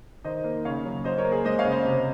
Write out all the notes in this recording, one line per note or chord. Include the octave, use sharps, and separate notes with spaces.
D#3 C5 D#5
A#3
C#3 C#5 F5
F#3
F#3 C5 D#5
A#4 C#5
A#3
G#4
G#3 C5 D#5
C#5 F5
C#3
C5 D#5
C3